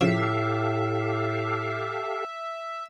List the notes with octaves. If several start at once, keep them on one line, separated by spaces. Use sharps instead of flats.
A2 C#3 F3 G4 A4 E5 F5